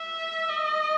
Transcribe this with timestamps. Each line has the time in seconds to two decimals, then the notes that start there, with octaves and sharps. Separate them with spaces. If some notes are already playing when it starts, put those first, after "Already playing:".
Already playing: E5
0.49 D#5